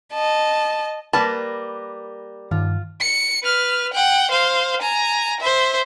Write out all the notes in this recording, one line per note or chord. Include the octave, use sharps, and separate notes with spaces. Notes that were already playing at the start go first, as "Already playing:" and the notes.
D#5 A5
G3 A#3 A#4 B4 A5
G2 D#3 F4
C#7
B4 F6
F#5 G5
C5 F5
G#5 A#5
C5 E5